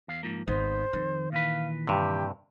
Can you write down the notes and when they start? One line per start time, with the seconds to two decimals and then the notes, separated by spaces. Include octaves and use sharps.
0.08 E2 F5
0.23 G#2 F3 A#3
0.48 G#1 B3 D#4 C5
0.93 F2 D#3
1.32 A#2 E3 B4 F5
1.87 G2 C3 G4